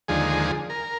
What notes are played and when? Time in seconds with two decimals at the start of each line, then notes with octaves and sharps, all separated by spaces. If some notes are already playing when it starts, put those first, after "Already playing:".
0.08 D#2 D3 F3 G#3 G#4
0.70 A#4